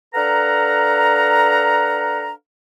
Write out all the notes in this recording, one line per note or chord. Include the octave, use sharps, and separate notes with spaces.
D4 A4 B4 F5 F#5 A#5